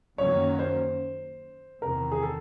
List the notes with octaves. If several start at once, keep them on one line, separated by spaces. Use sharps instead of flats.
F#2 D#3 F#3 A#3 C#4 C#5
C5
E2 C3 D#3 A#4
G#4
A4